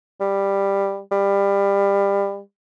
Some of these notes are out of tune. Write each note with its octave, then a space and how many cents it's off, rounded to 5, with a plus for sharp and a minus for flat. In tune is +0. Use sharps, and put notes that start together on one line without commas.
G3 +10
G3 +25